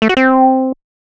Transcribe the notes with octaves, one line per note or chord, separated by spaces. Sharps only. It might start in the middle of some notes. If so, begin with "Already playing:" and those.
A3
F#4
C4